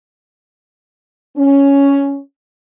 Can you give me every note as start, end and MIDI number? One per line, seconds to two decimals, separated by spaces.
1.37 2.18 61